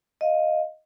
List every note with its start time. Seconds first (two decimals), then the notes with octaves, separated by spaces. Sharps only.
0.21 D#5 F5